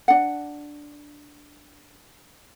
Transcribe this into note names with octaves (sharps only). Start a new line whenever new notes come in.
D4 F#5